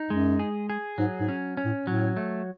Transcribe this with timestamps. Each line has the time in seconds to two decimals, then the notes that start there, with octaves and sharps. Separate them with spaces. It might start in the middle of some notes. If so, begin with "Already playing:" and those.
Already playing: D#4
0.10 F#2 G#3
0.39 G#4
0.70 G#4
0.98 G#2 F#3
1.20 G#2
1.29 C#4
1.57 C#4
1.65 A2
1.86 A2 F#3
2.17 A3